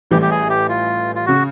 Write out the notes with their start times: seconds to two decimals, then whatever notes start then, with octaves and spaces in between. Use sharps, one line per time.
0.11 A1 A2 E3 G3 G4
0.22 G4
0.31 G#4
0.50 G4
0.69 F4
1.15 F4
1.26 C#3 F#4